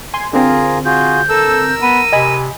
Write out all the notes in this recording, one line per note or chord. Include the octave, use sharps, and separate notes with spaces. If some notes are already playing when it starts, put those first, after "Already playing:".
G#5 C6
D3 C4 F4 G#4 A#4
F4 F#4 G#4 G6
A4 A#4 E6
B3 D#7
C3 D#5 G#5 B5